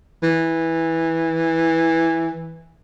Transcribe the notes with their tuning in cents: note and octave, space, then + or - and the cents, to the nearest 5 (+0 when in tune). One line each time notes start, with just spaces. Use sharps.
E3 -10